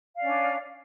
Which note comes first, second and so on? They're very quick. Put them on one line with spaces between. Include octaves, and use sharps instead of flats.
F5 D5 C#4 D4